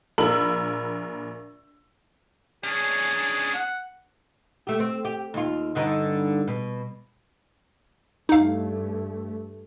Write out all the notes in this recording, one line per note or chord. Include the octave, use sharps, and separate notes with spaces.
A#1 A#3 A#4 B5 E6 F#7
C#4 D4 G#4
F#5
A3 G4
C4
G4
D#2 F4
G2 D3 D#4
B2
G2 A3 D#4 F5